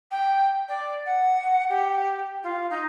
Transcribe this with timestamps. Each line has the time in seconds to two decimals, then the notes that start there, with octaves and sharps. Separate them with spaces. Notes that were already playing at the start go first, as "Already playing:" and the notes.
0.11 G5
0.68 D5
1.06 F#5
1.69 G4
2.43 F4
2.70 D#4